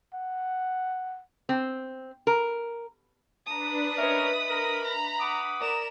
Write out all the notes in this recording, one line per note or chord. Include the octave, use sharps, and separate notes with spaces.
F#5
C4
A#4
D4 B4 A5 A#5 D#6
C#4 A#4 B4 C#5 D#5 E5 B5
A#4
A#5
F#5 D6 D#6
A#4 D5 A#5 E7